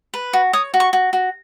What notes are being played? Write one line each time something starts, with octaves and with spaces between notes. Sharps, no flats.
B4
F#4
C#5 D#6
F#4
C#6
F#4
F#4